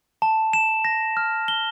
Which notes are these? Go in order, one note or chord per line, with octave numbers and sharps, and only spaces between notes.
A5
E7
A#6
F6
G7